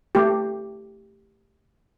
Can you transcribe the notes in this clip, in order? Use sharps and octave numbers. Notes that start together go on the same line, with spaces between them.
A3 G4